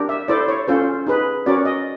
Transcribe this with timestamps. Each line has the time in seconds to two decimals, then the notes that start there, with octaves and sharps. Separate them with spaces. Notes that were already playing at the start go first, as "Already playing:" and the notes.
Already playing: D4 G4 A#4
0.09 E5
0.28 E4 A4 C5 D5
0.48 C#5
0.68 C#4 F4 A4 C5
1.07 D#4 G#4 B4
1.46 C#4 F#4 A#4 C#5 D5
1.65 D#5